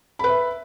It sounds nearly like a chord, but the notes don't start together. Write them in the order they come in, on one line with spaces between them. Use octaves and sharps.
B5 B4 E5